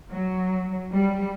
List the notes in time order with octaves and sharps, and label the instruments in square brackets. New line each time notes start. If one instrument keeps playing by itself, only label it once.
[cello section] F#3
G3